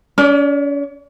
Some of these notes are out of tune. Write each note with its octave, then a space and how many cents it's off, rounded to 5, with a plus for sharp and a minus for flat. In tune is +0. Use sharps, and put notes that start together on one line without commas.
C#4 +40 D5 +0